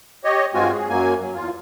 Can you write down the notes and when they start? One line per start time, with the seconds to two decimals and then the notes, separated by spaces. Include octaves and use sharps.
0.24 G4 C#5 D#5
0.54 G2 G#3 C4 F4 F#4 G#5
0.72 G#4
0.89 F#2 F#3 A#3 G#5
1.20 F#3
1.34 E2 F4